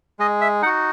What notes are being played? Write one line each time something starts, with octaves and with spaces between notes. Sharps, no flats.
G#3 D#5
E5
D#4 F#4 F#5